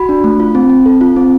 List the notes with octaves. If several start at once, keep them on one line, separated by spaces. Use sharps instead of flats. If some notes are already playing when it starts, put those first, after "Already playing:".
Already playing: F#4 B5
D4
A3
F4
C4
C4
A4
F4
C4